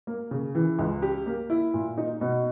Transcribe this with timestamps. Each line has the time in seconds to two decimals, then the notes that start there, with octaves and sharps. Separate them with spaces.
0.07 A#3
0.31 C#3
0.55 E3
0.79 C#2
1.02 G4
1.26 A#3
1.50 E4
1.74 A#2
1.98 D#4
2.21 B2